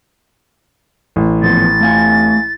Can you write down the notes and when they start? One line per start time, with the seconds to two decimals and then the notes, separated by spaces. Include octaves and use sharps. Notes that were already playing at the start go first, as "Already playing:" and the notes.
1.16 A1
1.42 A#2 F3 B3 A6
1.81 A3 F5 G#5